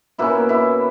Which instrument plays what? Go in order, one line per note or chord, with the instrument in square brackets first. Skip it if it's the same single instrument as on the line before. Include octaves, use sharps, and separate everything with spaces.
[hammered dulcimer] B2 A#3 C#4 E4 E5
E4 E5